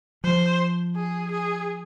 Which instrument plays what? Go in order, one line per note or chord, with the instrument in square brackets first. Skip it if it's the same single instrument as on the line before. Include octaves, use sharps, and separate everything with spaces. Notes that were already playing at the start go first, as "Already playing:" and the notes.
[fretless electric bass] F3 [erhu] C5
[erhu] G#4
G#4